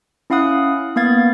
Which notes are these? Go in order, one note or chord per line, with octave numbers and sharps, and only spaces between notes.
C#4 E4 F5 F#5 D#6 F#6
A#3 B3 F5 G#6 A6